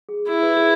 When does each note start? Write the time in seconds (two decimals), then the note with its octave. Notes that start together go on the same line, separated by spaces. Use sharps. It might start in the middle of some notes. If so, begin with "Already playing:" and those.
0.09 G#4
0.29 E4 G#4
0.43 B4
0.57 G#4